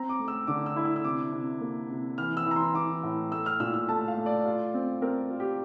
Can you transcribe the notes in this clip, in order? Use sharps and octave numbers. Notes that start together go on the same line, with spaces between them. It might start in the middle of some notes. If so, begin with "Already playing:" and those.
Already playing: C4 A#5
D6
A3
E6
D3 D6
E6
E4
E6
E6
C3 D6
C3
A#3
C3
E3 F6
E6
E3 A#5
C6
E3 D6
A2
A3 E6
F6
A#2 E6
E6
A3 A5
F5
A3
D5
F4
C4
C4 A#4
F4
G4